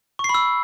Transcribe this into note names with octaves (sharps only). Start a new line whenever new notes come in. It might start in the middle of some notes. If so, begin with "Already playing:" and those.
C#6
C7
B5
E6